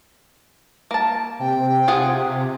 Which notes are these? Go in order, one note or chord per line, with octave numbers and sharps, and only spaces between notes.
A#3 A5
C3 G5
F4 G#4 F#5